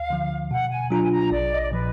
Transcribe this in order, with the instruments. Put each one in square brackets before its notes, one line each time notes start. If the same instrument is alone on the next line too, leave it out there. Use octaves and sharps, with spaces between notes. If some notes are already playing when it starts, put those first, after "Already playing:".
Already playing: [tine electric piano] D2 [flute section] F5
[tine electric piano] D3 F3
[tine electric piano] B2 [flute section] F#5
[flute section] G#5
[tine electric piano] F#3 D4 F4 [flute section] A#5
[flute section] G#5
A#5
[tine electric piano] A#1 [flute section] D5
[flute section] D#5
D5
[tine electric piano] A#2 F3 [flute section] B4